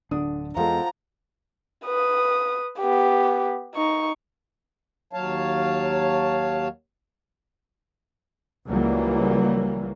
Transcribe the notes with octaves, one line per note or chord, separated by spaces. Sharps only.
D1 D3 D4 D#6
E2 F3 G#3 F4 A4 F#5 G5 A#5
B4 D#6
B3 G4
D#4 C#6
D#2 F#3 C#5 F5 A5
C#2 E3 F#3 G3 A#3